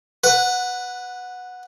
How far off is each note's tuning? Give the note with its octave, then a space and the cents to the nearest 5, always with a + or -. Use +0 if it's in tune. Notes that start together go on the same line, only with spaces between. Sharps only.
B4 +0 F#5 -15